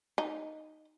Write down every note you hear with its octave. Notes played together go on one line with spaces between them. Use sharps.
D#4